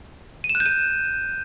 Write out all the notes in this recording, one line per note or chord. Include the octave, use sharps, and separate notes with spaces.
D#7
E7
F#6
G6
D#7